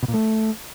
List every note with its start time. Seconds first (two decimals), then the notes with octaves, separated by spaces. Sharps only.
0.03 B2
0.08 A#2
0.14 A3